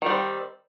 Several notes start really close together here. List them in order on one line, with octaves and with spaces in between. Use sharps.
D#3 G3 C4